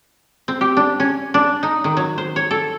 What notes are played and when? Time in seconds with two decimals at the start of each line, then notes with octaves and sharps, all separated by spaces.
0.48 C4
0.61 G4
0.77 D4
1.00 C#4
1.34 D4
1.63 D#4
1.84 D#3
1.97 F#3
2.18 C5
2.36 C#5
2.51 A4